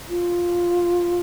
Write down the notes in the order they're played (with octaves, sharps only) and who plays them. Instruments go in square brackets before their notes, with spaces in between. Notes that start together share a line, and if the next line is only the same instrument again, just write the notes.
[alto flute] F4